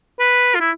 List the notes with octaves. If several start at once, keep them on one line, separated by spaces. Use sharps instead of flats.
B4
F4
E4